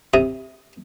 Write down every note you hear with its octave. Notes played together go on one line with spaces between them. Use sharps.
C3 D#6